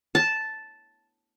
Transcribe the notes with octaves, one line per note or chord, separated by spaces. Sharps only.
A5